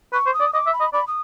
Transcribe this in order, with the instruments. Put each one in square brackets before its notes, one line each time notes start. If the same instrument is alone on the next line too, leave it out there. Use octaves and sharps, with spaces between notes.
[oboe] B4 [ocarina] C#6
[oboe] C5
[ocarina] D#6
[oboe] D5
[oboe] D#5 [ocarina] D6
[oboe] E5
[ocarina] B5
[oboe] D#5
[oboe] D5 [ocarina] B5
[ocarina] D#6